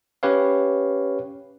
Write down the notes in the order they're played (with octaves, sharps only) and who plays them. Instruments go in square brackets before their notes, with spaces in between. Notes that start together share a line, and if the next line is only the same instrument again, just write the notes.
[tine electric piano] C#4 G4 B4 C#5 F5